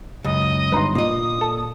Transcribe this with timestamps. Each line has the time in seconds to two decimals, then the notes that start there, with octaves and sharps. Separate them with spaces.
0.24 C#2 F#2 D#5
0.72 G1 D#4 B4 C6
0.95 A#2 A#3 D#5 D#6
1.41 A4